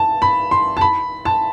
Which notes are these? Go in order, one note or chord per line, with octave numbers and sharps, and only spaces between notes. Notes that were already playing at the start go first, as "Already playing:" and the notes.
Already playing: A5
B5
C6
A5
B5
A5